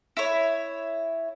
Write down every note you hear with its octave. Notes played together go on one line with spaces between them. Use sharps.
E4 C#5